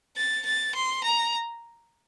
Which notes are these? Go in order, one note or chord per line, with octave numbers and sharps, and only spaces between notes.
A6
A6
C6
A#5